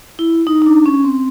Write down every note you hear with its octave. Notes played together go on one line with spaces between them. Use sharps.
E4
D#4
D#4
D4
C#4
C4